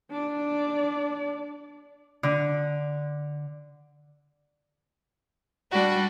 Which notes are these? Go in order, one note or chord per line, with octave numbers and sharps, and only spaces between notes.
D4 D5
D3
G3 D4 F#4